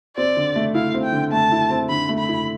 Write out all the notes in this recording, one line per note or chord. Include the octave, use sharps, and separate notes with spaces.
C4 D5
D3
A3
E4 F5
C4
G5
D3
A3 A5
E4
C4
D3 B5
A3
B5
E4